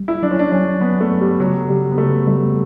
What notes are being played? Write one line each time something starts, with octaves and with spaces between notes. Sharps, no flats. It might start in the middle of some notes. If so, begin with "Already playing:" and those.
Already playing: G3
E4
F#3 D4
C#4
D4
F#3 C#4
F#3 B3
A3
G2
G3
C#3 F#3
C#3 G3
B3
C#3 A3
G3 A3